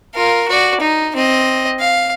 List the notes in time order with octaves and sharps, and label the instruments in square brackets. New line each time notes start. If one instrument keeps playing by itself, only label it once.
[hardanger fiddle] F4 A#4
F#4 D5
D#4
C4 D#5
F5